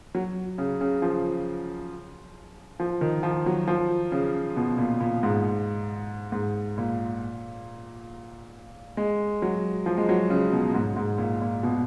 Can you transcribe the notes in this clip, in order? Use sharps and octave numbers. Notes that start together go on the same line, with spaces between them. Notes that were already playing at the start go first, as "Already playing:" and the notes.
F#3
C#3
C#3
F3
F3
D#3
F3
F#3
F3
C#3
B2
A#2
A#2
G#2
G#2
A#2
G#3
F#3
F3
G#3
F#3
C#3
B2
G#2
G#2
A#2
A#2
B2